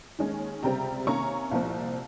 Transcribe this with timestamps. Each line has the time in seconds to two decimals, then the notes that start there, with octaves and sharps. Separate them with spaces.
0.19 D#2 D#3 G#3 C#4
0.63 C#2 C3 G3 C4 G5 A#5
1.06 C3 D#3 A#3 C#4 A#5 C#6
1.51 C2 A#2 F3 C4